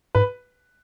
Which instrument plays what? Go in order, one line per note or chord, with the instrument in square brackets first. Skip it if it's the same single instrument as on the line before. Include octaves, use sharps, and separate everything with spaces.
[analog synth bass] G#2 [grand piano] B4